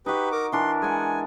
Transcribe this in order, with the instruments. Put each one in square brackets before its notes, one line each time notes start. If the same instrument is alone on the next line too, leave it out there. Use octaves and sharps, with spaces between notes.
[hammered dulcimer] D#4 F#4 [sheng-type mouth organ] G4 B4
[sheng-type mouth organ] A#4 D6
[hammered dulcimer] E3 D4 A#4 [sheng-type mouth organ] C6
[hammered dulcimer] G#3 F#5 [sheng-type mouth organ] G#5